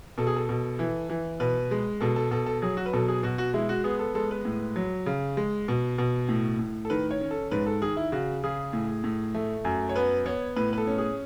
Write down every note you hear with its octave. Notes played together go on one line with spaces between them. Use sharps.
B2 A4
G#4
A4
B2
E3
E3
B2 B4
G#3
B2 A4
A4
B2 A4
A4
F#3 G#4
F#4
B4
B2 A4
G#4
B2 F#4
F#4
G#3 E4
F#4
B3 G#4
A4
G#3 A4
B4
A2
F#3
C#3
G#3
B2
B2
A2
A2
A4
D#3 B4
C#5
C#4
A4
G#2 B4
A4
D#3 G#4
E4
C#3 F#4
C#3 G#4
A2
A2
A3
F#2
C#5
B3 B4
B3 C#5
A2 B4
B4
A4
C#4
G#4